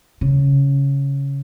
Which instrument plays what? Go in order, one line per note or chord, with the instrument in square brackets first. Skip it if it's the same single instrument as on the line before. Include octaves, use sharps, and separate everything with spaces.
[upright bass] C#3